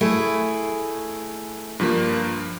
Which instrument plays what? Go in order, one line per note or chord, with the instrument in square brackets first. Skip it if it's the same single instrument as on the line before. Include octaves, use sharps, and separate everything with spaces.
[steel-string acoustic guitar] A3 E4 G#4
[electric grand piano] G2 F3 A#3